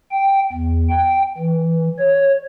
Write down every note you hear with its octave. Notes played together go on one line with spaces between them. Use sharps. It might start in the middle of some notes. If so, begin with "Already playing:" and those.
G5
E2
G5
E3
C#5